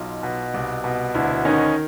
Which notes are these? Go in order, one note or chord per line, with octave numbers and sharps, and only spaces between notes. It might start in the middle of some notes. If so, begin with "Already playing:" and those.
Already playing: B1 D#4 F4
B2
C2
B2
D2 D4 E4
D#3 C#4 D#4